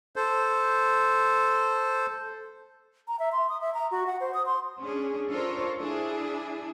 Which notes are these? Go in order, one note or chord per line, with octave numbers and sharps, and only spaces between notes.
A4 C5
A#5
E5
C6
D#6
E5
A#5
F#4
F#5
C5
D#6
C6
C#4 D4 G#4
D4 F4 A4 A#4 C5 C#5
D4 E4 G#4